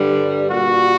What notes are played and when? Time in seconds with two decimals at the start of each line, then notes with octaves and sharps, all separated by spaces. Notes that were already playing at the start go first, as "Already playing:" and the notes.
Already playing: G2 D3 G3
0.49 A#2 G3 F#4